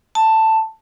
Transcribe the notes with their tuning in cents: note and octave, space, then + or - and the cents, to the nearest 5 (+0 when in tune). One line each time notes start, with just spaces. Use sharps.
A5 +10